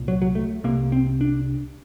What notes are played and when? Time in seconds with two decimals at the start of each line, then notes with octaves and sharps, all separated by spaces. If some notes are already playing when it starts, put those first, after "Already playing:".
Already playing: C2 A#2
0.08 F#3
0.22 F#3
0.35 A3
0.64 C2 C3 A#3
0.92 C4
1.21 D4